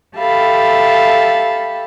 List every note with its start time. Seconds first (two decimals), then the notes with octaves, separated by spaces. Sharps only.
0.18 G4 A4 E5 F5 A5 B5